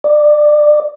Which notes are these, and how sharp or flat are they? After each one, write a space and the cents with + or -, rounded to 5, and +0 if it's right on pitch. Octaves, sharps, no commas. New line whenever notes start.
D5 +25